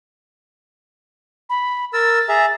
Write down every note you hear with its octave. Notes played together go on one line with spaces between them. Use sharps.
B5
A#4 E6 A6
G#4 E5 A#5